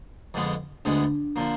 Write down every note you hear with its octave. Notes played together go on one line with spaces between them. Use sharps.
F2 D3 G#3 B3
D2 D3 G#3 B3 D4
D3 F3 A#3